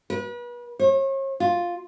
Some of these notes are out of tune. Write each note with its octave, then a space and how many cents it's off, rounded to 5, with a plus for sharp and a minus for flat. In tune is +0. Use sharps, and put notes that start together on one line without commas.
B4 -35
C#5 -40
F4 +5